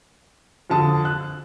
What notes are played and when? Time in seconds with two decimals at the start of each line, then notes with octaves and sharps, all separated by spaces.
0.70 F2 D3 A5 D#6
1.05 F#6